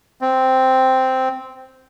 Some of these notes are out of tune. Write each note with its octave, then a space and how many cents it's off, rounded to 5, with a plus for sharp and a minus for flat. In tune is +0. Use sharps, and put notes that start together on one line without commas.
C4 -5